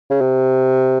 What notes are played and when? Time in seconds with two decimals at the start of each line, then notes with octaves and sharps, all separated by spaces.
0.10 C#3
0.21 C3